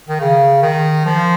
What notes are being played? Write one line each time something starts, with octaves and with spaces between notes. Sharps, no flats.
D#3
C#3
D#3
F3